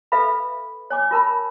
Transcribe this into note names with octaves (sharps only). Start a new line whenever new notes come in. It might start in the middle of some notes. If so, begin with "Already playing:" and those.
A4 B4 E5 F5 B5
C#5 G#5 D6
F4 A#4 A5 B5